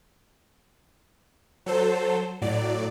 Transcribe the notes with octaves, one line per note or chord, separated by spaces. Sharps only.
F#3 A4 C5
A2 F#3 D5